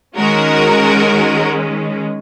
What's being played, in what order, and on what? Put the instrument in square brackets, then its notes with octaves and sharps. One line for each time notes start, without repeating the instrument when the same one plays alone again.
[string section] D#3 G#3 C#4 F#4 A#4